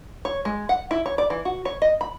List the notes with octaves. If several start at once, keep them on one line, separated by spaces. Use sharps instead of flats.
C#5
G#3
F#5
E4
C#5
D5
E3
F#4
C#5
D#5
B5